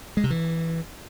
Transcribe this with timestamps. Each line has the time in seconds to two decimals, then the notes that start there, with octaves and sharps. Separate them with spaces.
0.17 G#3
0.24 C3
0.30 E3